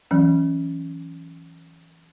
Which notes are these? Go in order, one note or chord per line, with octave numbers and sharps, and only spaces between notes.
E3 F#3 C#4